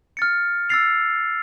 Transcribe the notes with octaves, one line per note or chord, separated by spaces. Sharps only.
F6 A6 C#7
E6 A6 C7 F7